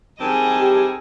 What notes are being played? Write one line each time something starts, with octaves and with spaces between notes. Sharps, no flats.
D#3 G3 C4 G#4 D#5 G#5 A5
G4